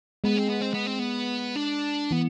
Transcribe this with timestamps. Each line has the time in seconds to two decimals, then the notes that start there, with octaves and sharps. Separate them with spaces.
0.24 G#3 B3
0.37 C4
0.49 B3
0.61 C4
0.74 B3
0.87 C4
0.99 B3
1.55 D4
2.11 E3 B3